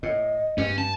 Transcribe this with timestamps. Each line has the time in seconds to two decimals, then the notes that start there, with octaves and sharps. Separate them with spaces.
0.03 A2 D#5
0.58 G2 C#4
0.78 A5